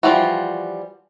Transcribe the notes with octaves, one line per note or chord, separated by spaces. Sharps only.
E3 F3 G3 F4 F#4